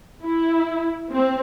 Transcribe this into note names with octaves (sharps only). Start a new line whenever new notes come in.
E4
C4